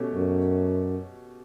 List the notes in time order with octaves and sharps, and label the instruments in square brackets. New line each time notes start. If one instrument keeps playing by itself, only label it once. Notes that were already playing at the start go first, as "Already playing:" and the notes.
Already playing: [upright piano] B2 A3 C#4 G4
[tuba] F#2